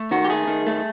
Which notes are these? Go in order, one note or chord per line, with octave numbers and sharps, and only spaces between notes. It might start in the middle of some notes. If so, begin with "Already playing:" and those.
Already playing: A3
D#3 F#4
G4
A3 G#4
D#3
A3